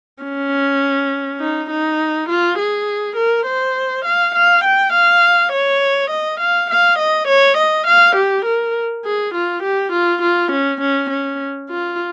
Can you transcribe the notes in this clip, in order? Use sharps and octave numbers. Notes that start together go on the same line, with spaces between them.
C#4
D#4
D#4
F4
G#4
A#4
C5
F5
F5
G5
F5
C#5
D#5
F5
F5
D#5
C#5
D#5
F5
G4
A#4
G#4
F4
G4
F4
F4
C#4
C#4
C#4
F4